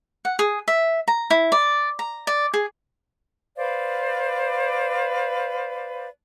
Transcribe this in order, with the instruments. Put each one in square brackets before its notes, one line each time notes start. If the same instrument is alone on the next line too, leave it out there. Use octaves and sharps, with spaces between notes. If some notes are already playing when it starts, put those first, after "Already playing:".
[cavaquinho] F#5
G#4
E5
A#5
E4
D5
A#5
D5
G#4
[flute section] B4 C5 D5 F5